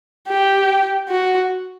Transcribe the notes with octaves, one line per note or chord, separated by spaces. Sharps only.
G4
F#4